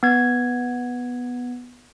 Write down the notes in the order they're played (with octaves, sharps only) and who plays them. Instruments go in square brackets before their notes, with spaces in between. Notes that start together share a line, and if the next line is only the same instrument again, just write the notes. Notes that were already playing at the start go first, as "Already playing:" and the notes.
[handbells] B3 G#6